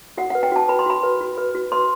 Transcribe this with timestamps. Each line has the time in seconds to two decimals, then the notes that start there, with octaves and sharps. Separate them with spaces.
0.17 F#4 F#5
0.30 B4 F#5
0.43 G5
0.52 F#4 A5
0.68 B4 B5
0.79 C6
0.86 F#4 B5
1.03 B4
1.21 F#4
1.38 B4
1.55 F#4
1.72 B4 C6